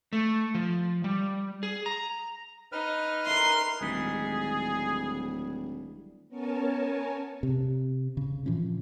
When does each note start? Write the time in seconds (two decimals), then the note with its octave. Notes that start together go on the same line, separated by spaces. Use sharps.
0.13 A3
0.55 F3
1.04 G3
1.63 G#4
1.86 A#5
2.72 D#4 B4 F6
3.26 E4 A#4 C6
3.81 D1 D#3 G3 G#3 G#4
6.28 B3 C#4 A#4 C#5 G#5 A5
7.43 C3
8.17 C#3
8.46 A#2 E3 F3 C#4